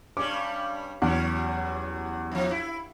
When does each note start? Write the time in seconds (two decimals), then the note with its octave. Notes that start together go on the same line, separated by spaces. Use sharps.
0.17 G2 G3 C#4 D6
1.02 E2 F#3 G3 C#4
2.32 F2 F3
2.51 E4